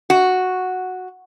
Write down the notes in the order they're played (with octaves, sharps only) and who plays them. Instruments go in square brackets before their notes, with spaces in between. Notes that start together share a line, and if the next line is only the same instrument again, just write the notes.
[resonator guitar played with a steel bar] F#4